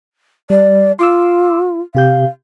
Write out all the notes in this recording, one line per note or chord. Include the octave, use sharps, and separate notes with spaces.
G3 D5
F4 C6 D6 E6
C3 G4 F5 G6